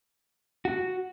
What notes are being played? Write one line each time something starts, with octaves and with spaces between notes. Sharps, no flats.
F#4